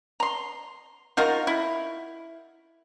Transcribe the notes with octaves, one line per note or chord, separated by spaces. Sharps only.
A#5 C6
D#4 F4 F#4 A#4
E4